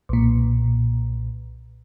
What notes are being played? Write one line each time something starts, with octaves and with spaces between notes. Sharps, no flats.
B1 A#2